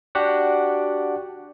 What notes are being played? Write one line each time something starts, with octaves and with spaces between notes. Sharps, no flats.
D4 F#4 G4 F#5